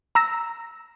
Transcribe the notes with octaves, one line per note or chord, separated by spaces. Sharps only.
A#5 E6 A#6